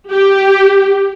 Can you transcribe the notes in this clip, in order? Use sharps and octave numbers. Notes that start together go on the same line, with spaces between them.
G4